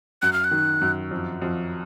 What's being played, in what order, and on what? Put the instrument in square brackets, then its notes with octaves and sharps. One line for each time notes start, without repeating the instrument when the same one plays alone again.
[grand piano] F#2 [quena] F#6
[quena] F6
F#6
[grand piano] D#3
F#2
F2
F2